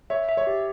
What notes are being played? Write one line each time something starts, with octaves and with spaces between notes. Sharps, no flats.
C#5 E5
E5
C#5
G4